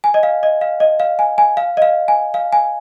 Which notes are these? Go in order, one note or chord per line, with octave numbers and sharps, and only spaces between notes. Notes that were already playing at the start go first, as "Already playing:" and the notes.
G#5
D#5
F5
D#5
F5
D#5
F5
G#5
G#5
F5
D#5
F5
G#5
F5
G#5